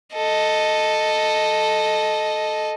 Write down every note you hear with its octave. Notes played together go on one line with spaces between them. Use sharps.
A4 D#5